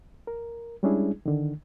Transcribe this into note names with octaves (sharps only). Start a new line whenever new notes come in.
A#4
G3 G#3 C#4 D4 E4 G#4
D3 D#3